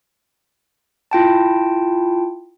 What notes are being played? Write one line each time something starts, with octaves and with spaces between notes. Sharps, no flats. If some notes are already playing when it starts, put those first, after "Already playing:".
E4 F4 G5 A5